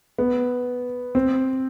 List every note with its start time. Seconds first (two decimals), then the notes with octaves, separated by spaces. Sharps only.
0.18 B3
1.15 C4